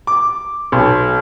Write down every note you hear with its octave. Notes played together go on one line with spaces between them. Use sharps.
D6
B1